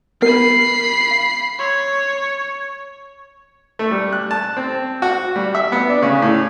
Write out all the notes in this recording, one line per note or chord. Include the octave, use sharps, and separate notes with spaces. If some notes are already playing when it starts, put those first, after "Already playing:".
B3 G4 A#4 B5 C7
F5
C#5 B5 C6 E6
A3
G3
F#6
A5
C4
F#4
G3
E5
B3
D4
C#3
A2